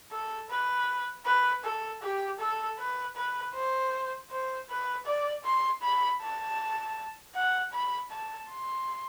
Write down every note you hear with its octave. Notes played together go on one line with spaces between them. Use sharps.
A4
B4
B4
A4
G4
A4
B4
B4
C5
C5
B4
D5
C6
B5
A5
F#5
B5
A5
C6